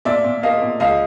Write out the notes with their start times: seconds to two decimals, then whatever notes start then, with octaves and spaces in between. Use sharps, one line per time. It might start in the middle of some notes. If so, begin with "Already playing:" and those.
0.05 A#2 D5 E5
0.25 A#2
0.43 A#3 D#5 F5
0.62 A#2
0.80 C#2 D#5 F5